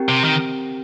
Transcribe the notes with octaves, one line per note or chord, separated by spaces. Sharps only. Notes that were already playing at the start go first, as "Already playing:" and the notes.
Already playing: C4 G4 A#4 G5
C3
D#3